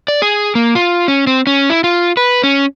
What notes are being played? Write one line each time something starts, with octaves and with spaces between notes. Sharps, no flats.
D5
G#4
A#3
F4
C#4
C4
C#4
E4
F4
B4
C#4